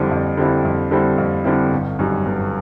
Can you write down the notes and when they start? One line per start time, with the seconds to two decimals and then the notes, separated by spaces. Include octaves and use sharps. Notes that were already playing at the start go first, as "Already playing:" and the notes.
Already playing: F2 D3 G3 C4 E4
0.11 F2
0.37 D3 G3 C4 E4
0.65 F2
0.91 D3 G3 C4 E4
1.18 F2
1.44 D3 G3 C4 E4
1.72 G1
1.99 F#2 D#3 G3
2.26 G1